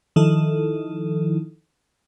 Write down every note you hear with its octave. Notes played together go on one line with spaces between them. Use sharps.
D#3 F3 D#4 E4 A4